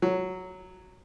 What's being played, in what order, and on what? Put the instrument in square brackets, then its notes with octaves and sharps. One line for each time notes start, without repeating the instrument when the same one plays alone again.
[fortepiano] F#3